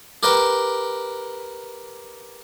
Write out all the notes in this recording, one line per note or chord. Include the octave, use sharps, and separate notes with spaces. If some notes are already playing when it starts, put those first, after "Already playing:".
G4 A#4 B4 G5